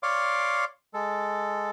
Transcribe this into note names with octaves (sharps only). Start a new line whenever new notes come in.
C#5 D5 F5 C6 D6
G#3 A4